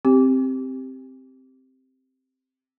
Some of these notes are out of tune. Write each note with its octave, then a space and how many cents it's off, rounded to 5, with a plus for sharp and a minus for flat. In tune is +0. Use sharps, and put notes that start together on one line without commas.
C4 +0 G4 +0